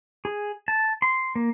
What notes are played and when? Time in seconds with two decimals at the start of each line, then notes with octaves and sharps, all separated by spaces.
0.25 G#4
0.68 A5
1.02 C6
1.36 A#3